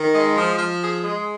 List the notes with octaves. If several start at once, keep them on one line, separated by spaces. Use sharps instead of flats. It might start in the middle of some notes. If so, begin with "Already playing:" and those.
Already playing: D#3
G#3
F3
F3
G#4
G#3